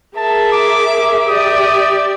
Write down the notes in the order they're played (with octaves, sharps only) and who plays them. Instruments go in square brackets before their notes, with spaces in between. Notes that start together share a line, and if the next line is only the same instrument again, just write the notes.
[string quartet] G#4 A#4 E5 [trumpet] A5
[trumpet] D6
[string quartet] G4 D5 E5 [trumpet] D#6